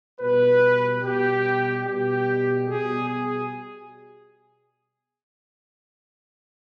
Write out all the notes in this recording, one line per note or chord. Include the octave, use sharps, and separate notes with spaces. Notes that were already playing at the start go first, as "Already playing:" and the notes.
B2 G3 B4
B2 G3 G4
B2 G3 G4
B2 G3 G#4
G#4